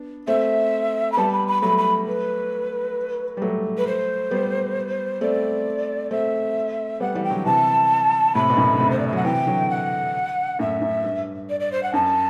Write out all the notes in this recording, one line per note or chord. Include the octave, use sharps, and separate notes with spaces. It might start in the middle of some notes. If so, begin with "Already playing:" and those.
Already playing: B3 D4
A3 C4 E5
B5
G3 B3 A5
B5
B5
F#3 A3 B5
B5
B4
G3
F#3 A3
B4
C5
G3 B3
A3 C4 D5
A3 C4 E5
G3 B3 F#5
E3 G3
G5
D3 F#3
C3 E3 A5
A2 C3 B5
B2
F#2 A2
D3
A2 C3
C5
D5
E5
F#3 F#5
C3 E3 G5
D3 F#3
F#5
F#2 A2 E5
F#2
G2
D5
D5
C5
F#5
F#2 A5